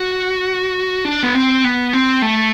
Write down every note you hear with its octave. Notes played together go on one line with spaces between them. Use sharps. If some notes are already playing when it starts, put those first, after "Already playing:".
Already playing: F#4
D4
B3
C4
B3
C4
A3